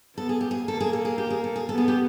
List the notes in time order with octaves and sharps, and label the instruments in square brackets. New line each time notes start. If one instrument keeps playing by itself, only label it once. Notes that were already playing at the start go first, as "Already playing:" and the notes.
[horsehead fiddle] B3 [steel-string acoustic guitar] A4
[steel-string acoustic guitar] G#4
G4
G#4
[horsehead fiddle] A#3 [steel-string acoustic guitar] A4
[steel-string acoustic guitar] G#4
A4
G#4
G4
G#4
A4
G#4
[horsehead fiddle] B3 [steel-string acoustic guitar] A4
[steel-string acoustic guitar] G#4
G4